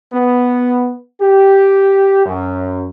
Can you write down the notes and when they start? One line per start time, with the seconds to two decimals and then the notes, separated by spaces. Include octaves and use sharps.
0.13 B3
1.21 G4
2.25 F#2